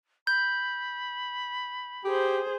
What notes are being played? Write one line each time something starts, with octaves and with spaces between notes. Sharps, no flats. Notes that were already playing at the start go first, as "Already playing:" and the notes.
B5 G6
G4 G#4 C5